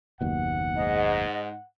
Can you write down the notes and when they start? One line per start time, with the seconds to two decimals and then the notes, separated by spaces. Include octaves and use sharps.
0.21 F#1 D#2 B2 F#5
0.76 G#2 D#5